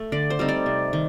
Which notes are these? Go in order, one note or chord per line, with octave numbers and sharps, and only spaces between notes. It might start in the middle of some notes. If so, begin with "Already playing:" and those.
Already playing: A3
D3 D5
C5
G3 C4 D#4
D5
C3
D#3